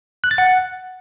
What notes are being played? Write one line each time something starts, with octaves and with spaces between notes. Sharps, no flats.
F#6
A6
F#5